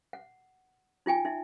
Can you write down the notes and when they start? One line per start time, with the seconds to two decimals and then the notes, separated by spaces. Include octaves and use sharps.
0.13 F#5
1.06 D#4 F4 G5 G#5
1.25 D#4 E5